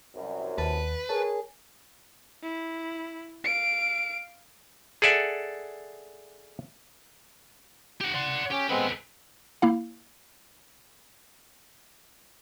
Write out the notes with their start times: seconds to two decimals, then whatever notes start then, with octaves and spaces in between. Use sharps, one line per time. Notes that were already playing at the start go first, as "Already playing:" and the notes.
0.15 C2 F#2
0.58 D#2 B4 A5
1.09 G#4 A#4 C#5 A5
2.43 E4
3.44 F5 D7
5.02 G#4 A4 D5 E5 F#5
8.01 G4 F#5
8.15 D5 F#5 C6
8.51 C#4 G4
8.70 G#3 B3 C4 A4 B4
9.62 A#3 E4 F5